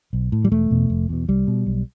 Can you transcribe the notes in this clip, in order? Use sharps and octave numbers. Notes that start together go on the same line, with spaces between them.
B1
A2
G3
E1 A3
E2 B2
F1
E2 B2
C2 G3
B2
B1